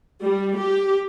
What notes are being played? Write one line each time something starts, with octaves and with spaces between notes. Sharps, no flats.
G3
G4